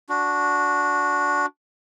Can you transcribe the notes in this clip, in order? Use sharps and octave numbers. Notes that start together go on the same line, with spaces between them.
D4 F#4